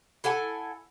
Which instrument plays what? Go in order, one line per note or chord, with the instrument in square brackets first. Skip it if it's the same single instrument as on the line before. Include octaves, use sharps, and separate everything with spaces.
[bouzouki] E4 A4 F#5 G#5